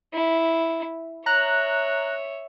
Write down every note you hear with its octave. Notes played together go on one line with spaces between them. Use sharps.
E4
C#5 E5 A#5 F#6